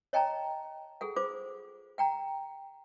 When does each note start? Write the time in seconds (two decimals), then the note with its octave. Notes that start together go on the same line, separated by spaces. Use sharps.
0.13 C#5 D#5 G5 A5 A#5
1.01 G#4 A4 F#5
1.16 F4 C5 D6
1.98 F#5 G5 A#5